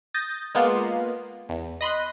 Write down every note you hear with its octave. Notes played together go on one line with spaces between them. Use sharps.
D#6 G6 A6 A#6
G#3 A#3 B3 F4
E2
D#5 B5 C6 F#6